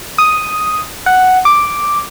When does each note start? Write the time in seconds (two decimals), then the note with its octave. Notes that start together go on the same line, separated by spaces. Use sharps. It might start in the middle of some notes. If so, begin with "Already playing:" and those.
0.18 D#6
1.06 F#5
1.45 D6